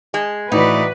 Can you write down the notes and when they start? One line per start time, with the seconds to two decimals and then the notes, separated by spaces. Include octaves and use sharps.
0.14 G#3
0.52 A2 E3 D#4 F#4 B4 D5